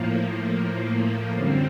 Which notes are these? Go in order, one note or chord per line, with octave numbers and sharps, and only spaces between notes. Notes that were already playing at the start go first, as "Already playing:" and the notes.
Already playing: A2 F3 A#3
F#2 D3 G3 C4